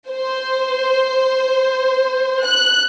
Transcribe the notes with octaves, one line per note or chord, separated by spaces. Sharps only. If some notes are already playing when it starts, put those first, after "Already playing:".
C5
F#6